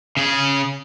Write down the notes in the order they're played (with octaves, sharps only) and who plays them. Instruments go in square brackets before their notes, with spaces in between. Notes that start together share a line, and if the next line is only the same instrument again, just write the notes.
[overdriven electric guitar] C#3 G#4